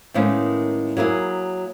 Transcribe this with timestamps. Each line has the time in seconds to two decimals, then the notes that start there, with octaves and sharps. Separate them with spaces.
0.14 A2 D#3 G#3 A#3 B3 C#4
0.97 F#3 A#3 E4 G#4